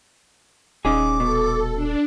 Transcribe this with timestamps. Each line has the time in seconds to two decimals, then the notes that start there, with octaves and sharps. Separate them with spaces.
0.85 D#1 C#4 D#4 G#4 D6
1.20 B2 A4
1.75 D4